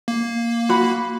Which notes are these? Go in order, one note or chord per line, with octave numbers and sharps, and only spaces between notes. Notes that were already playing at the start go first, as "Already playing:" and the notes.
A#3
F#4 B5